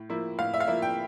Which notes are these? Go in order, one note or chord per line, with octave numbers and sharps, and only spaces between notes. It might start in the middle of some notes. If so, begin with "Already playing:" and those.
Already playing: A2
F3 A#3 E4
A2 F5
E5
F5
F3 A#3 E4 E5
G5